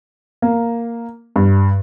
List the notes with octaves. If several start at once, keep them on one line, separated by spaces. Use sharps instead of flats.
A#3
G2